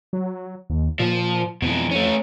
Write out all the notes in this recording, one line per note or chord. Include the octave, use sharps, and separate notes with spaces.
F#3
D#2
A#2 F3
F2 B2 E3
A3 C#4